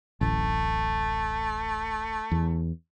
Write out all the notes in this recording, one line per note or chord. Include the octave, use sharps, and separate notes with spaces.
D1 A1 A3
E2